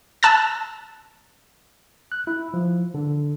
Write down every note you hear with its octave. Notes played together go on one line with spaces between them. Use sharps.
A5 E6 F#6 A6
F#6
E4
F3
D3